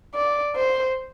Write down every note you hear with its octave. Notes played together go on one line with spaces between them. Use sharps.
D5
C5